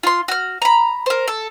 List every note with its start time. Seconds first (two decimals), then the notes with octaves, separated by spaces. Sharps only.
0.03 F4 C6
0.28 F#4 F6
0.62 A#5 B5
1.06 A#4 C5
1.28 A4